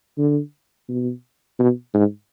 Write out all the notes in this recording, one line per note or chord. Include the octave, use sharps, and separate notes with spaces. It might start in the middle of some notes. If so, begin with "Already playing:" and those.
D3
B2
B2
G#2